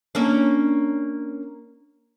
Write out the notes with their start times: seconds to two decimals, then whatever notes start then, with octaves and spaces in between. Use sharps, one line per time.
0.15 A#3 C#4 D4